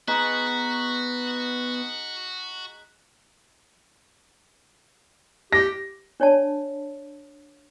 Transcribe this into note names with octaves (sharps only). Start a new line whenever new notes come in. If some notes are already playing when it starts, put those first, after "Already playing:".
G#3 B3 D#4 F#4 F#6 B6
G4 A#6
D4 C#5 D5 A5